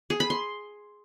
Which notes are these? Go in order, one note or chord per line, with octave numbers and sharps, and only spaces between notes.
G#4
B5
C6